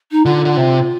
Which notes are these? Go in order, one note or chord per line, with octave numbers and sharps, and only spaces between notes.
D#4
D3 F4
D3
C3